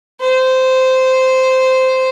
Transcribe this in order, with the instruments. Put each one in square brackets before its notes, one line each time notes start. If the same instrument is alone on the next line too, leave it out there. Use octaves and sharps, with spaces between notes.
[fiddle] C5